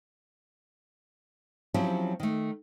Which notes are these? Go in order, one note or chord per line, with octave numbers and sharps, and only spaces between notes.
F3 F#3 C4 C#4 E4 G4
D#3 A3